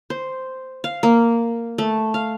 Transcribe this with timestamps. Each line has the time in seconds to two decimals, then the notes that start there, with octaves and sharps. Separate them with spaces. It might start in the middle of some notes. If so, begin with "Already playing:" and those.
0.10 C5
0.84 F5
1.03 A#3
1.78 A3
2.14 F5